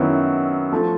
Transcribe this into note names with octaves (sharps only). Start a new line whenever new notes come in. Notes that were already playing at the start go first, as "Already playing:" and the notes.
Already playing: F#2 D#3 F#3 B3 E4
F3 A3